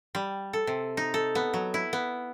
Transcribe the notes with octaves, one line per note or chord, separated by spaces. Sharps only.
G3
A4
C3
D#4
A4
B3
F#3
E4
B3